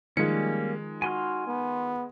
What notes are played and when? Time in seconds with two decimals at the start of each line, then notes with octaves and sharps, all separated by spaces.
0.17 D#3 F3 G3 G#3 A#3 C#4 C#7
1.02 F#4 G#5 C6 F6
1.47 B3